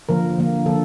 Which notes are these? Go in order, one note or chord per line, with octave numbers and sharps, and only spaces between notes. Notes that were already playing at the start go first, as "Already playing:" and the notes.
D3 F3 A#3 A#4
D3 F3 A#3
D3 F3 A#3 A4